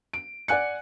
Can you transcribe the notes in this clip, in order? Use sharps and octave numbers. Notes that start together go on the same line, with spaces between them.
D7
D5 F#5 G#5 F#6 C#7